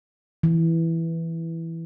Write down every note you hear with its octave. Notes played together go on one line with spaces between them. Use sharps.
E3